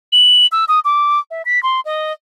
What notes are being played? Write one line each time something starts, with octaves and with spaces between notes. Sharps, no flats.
F#7
E6
D#6
D6
E5
B6
C6
D#5